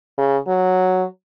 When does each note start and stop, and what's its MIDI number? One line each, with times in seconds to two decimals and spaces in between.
0.18 0.37 49
0.48 1.04 54